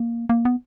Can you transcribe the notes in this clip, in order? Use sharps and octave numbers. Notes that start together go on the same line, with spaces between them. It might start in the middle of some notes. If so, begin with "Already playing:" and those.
Already playing: A#3
A#3
B3